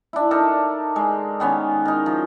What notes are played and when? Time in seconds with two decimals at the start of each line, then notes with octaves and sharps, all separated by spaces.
0.13 D4 E4
0.31 D4 D#4 A4 A#4
0.96 G#3
1.40 D#3 B3 C#4
1.85 D#4 A#4
2.06 F3